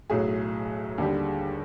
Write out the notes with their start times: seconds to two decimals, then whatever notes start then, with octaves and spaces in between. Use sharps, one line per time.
0.10 B1 A2 F#3 G#4
0.98 D#2 D3 G3